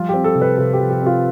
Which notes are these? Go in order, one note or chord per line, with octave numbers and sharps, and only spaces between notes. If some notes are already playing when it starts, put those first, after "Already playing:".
Already playing: F3 G3 F4
C4 G4
A4
C3
B4
C3 A4
G4
F3
G4
C4 F4